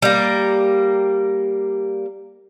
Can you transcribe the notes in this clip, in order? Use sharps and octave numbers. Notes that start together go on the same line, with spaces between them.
G3 A#3